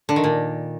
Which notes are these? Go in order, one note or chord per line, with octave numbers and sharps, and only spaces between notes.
D3
D#3
A#2